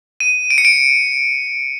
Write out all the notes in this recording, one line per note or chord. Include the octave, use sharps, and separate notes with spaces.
D#7
D7
C#7
D7